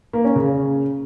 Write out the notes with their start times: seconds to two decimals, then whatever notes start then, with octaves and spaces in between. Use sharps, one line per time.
0.13 A#3
0.24 C#4
0.35 C#3